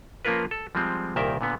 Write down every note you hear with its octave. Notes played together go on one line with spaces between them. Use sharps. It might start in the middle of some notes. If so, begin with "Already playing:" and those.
F3 A#3 C#4 F4 A#4 B4
A4
F3 G3 G#3 C4
C2 A#2 D#3 A#4 E5 G5
A#2 D3 B3